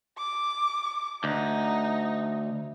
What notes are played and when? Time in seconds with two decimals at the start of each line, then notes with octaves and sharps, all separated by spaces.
0.18 D6
1.24 D2 D#4